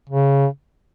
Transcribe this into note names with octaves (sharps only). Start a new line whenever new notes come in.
C#3